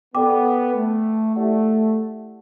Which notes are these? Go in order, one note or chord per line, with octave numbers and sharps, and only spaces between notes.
B3 A4 D5 G5 D6
A3
A3 E4 G4 D5 F#5 A5